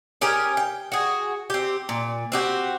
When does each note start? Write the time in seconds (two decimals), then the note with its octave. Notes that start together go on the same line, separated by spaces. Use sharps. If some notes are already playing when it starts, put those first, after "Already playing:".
0.21 C#4 G4 G#4 A#4
0.57 G5
0.92 F#4 G#4
1.50 C4 G4
1.89 A#2
2.32 C4 F#4 G4